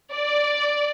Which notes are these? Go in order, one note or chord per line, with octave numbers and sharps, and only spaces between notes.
D5